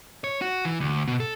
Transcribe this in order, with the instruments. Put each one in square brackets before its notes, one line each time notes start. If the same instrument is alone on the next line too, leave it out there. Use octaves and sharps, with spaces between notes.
[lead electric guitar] C#5
F#4
E3
D2
B2
A4